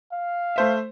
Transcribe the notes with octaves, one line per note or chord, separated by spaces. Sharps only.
F5
A3 C5 E5